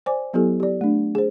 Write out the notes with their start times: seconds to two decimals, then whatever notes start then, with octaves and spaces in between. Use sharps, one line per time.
0.06 C5 D5 G#5 D6
0.34 F#3 B3 E4 G4 A4
0.60 G4 D5
0.81 A3 D4
1.15 G#4 C5